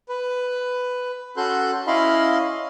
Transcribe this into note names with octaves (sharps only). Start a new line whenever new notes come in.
B4
C#4 F#4 A4 C6 F#6 G6
C#4 E4 D#5 F5 B5 C6